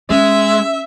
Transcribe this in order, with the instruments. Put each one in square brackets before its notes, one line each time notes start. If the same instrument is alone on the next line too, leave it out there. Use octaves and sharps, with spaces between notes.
[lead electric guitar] G#3 [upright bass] C#4 [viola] E5